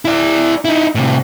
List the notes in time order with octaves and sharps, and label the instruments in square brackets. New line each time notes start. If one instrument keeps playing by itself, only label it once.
[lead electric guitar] E4 D5
D#4 E4
A2 C3